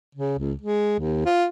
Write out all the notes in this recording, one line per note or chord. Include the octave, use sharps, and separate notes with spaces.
C#3
C#2
G#3
D#2
F4